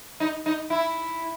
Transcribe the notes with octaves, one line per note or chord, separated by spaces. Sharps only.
D#4
D#4
E4